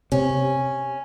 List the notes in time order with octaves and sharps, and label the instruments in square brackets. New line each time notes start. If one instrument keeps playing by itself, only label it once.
[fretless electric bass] C3 [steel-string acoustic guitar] C#4